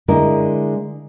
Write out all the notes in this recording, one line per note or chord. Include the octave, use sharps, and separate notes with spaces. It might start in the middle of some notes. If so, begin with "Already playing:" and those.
D3 G#3 E4 A#4